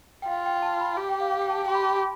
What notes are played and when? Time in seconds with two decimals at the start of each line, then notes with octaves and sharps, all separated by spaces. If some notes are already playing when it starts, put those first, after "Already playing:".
0.22 G5
0.27 F4 F5
0.46 G5
0.62 A5
0.80 B5
0.97 G4
1.09 G5
1.21 F5
1.32 F5
1.41 G5
1.50 A5
1.59 G5
1.68 G4 C6
1.75 B5
1.83 A5
1.89 B5